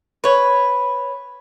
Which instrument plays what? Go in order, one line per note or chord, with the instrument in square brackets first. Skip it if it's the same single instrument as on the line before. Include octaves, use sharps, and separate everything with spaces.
[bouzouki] B4 C#5